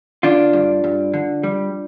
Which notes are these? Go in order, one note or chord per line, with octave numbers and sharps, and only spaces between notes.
D3 D4 F4
G2
G2
D3
G3